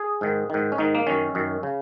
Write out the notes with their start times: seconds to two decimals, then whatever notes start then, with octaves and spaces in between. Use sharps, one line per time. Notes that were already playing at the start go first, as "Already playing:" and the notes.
Already playing: G#4
0.21 G#2 D#3
0.50 G#2 D#3
0.72 C#4
0.78 G#2 D#3 D#4
0.95 A#3
1.07 F#2 D#3 C#4
1.35 F#2 D#3
1.63 C#3